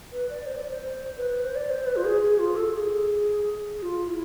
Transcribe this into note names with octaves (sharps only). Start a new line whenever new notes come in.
B4
D5
C5
D5
C5
B4
B4
C5
D5
C5
B4
F4
G#4
G#4
F4
A4
G#4
G#4
F4
F4
E4